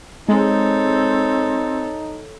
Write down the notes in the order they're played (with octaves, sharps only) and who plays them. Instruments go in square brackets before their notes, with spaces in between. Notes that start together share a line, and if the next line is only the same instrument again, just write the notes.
[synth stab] G#3 [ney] C4 [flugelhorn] D#4 [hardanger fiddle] A4 C#5